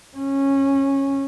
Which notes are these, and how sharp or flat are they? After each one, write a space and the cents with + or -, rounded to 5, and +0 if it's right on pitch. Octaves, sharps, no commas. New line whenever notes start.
C#4 -15